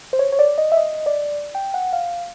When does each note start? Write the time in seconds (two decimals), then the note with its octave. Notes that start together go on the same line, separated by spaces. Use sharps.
0.13 C5
0.19 C#5
0.32 C#5
0.39 D5
0.58 D#5
0.72 E5
0.77 D#5
1.06 D5
1.55 G5
1.74 F#5
1.93 F5